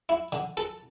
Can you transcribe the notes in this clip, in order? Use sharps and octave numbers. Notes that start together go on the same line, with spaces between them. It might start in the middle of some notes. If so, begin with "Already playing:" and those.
E4
D3
A4